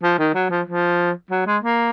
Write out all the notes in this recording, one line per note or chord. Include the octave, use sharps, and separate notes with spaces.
F3
D#3
F#3
F3
F3
F#3
G#3
A#3